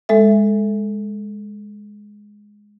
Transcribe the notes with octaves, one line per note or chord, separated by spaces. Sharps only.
G#3 A4 E5